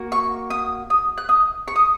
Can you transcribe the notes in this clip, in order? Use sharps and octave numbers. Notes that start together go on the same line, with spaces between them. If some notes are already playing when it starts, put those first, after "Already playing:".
Already playing: A#3 F#4
C#6
D#6
D#6
F#6
D#6
C#6
D#6